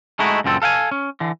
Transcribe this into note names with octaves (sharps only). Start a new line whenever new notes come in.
G#3 A3 D#4 E4 F#4
C#2 F#2 A#2 C4 A4
A4 F5 F#5 G#5
C#4
D3 E3